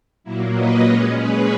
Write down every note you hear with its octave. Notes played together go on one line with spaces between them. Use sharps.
A#2 F#3 A#3 E4
B4 D#5
A#2 G#3 C#4 A#4 C#5
G#4 B4